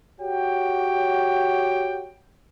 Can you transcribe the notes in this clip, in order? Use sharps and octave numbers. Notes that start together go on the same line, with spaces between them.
F#4 G4 C#5 G5